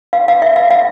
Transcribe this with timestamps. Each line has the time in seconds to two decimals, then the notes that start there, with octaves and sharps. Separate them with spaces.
0.13 F5
0.28 F5
0.42 E5
0.56 F5
0.71 F5